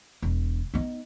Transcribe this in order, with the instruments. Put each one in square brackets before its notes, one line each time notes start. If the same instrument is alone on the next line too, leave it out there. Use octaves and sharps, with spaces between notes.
[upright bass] E1
B3 D#4